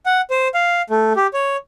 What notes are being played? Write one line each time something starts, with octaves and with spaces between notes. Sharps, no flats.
F#5
C5
F5
A3
G4
C#5